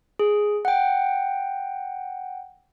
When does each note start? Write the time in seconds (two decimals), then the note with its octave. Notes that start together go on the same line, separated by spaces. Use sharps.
0.19 G#4
0.65 F#5 G5